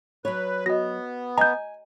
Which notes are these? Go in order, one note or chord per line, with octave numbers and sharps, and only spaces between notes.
F#3 B4 C#5
B3 F#4 D#5 A#6
D#5 G#5 A#5 G6